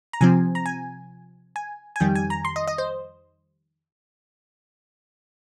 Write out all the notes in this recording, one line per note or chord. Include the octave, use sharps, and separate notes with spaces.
A#5
C3 F3 C4 G#5
A#5
G#5
G#5
G#5
F2 D#3 G3 G5
G#5
A#5
C6
D#5
D#5
C5